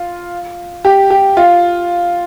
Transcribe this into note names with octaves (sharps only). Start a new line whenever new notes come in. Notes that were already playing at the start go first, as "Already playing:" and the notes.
Already playing: F4
G4
G4
F4